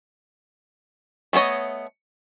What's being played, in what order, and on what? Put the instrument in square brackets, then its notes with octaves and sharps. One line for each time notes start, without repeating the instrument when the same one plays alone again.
[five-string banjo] A3 B3 A4 C#5 D#5